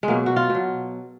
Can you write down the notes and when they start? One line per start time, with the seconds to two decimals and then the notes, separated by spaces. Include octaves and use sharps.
0.03 G#3
0.08 B2 F#3 A#3
0.26 F#4
0.36 F4
0.50 B2
0.55 F#3